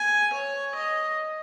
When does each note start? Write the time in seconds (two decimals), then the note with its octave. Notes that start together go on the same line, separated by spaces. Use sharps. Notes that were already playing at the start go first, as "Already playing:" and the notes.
Already playing: G#5
0.33 C#5
0.75 D#5